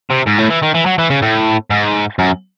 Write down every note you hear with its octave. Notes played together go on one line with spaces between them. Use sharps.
C3
G#2
A2
E3
D#3
E3
F#3
E3
C#3
A2
G#2
F#2